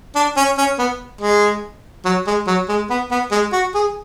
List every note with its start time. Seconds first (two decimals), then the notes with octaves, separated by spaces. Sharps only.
0.15 D4
0.37 C#4
0.58 C#4
0.79 B3
1.21 G#3
2.05 F#3
2.27 G#3
2.47 F#3
2.69 G#3
2.90 B3
3.11 B3
3.31 G#3
3.53 F#4
3.75 G#4